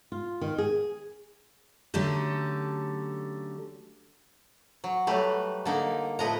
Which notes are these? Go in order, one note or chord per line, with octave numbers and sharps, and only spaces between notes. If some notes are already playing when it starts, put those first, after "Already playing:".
F4
D#3
G#4
D3 F#3 A3 C#4 G4 A4
F#3
F#3 G3 A3 B4 A#5
D3 A#3 D#4
A2 F3 A3 B4 D#5 A#5